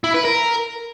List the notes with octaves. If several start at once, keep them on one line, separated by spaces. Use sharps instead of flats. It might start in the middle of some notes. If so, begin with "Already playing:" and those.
E4
B4
A#4